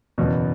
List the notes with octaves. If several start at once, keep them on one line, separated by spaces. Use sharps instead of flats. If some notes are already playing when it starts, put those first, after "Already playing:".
F#1 E2 B2